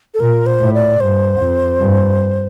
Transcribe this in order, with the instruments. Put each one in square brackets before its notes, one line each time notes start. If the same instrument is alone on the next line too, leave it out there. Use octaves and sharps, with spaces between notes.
[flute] A4
[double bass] A#2 [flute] A#4
[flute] C5
[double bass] A2
[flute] D5
[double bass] G2 [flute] C5
[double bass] F2
G2